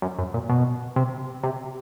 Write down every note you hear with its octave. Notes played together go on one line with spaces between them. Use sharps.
F#2
F#2
A#2
B2
C3
C3